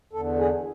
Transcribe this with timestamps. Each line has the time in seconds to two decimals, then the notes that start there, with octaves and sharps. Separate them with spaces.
0.13 E2 D3 A4
0.39 G#4